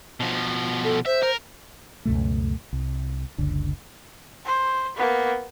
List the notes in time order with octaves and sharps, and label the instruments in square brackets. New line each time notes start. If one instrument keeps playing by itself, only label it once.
[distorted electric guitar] B2 F3
[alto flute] A4
[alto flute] C5 [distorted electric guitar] E5
[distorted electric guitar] A#4
[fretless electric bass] C#2 F#2 B2 A3
C2
F#1 C#2 D3
[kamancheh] C5
A#3 B3